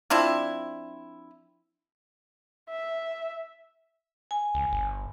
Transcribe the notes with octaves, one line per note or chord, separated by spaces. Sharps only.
F3 C4 D4 E4
E5
G#5
C#2
G1